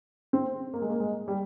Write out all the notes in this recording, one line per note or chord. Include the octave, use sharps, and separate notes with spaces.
C4
A#3
G#3
A#3
G#3
G3